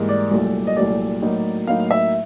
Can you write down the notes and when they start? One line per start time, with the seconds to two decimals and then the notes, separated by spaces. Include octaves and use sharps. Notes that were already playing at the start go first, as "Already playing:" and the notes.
Already playing: G#2 E3 G3 A#3
0.09 D5
0.31 C2 A#2 F#3 A3
0.67 D#5
0.76 C2 A#2 F#3 A3 D5
1.22 A2 F#3 A#3 D#4
1.67 A2 F#3 A#3 D#4 F5
1.91 E5